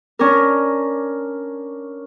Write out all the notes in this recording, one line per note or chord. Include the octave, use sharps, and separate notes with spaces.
C#4 D4 A#4